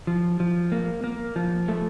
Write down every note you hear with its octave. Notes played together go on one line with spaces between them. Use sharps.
F3
F3
A#3
A#3
F3
A3